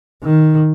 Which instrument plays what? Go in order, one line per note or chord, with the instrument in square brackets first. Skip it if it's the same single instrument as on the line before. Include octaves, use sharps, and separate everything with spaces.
[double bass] D#3